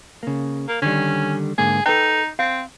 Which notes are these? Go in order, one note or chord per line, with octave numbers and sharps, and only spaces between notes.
C#3 A#3
A#3
D3 D#3 G3 C#4
G#2 D3 A#3 G#4
D#4 A4 B4 G5
C4 F5